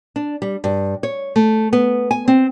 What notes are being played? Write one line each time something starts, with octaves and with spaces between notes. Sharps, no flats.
D4
G3
G2
C#5
A3
B3
G#5
C4